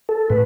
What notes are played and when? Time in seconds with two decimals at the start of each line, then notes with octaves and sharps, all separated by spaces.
0.09 A4
0.30 A2 B4